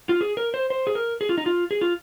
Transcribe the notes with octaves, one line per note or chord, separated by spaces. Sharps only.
F4
G#4
A#4
C5
C5
G#4
A#4
G#4
F4
D#4
F4
G#4
F4